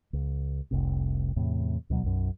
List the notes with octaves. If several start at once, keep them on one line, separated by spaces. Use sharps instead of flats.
C#2
F1 C2 C3
E2 A2 C3
D2 B2 F#3
B1 F#2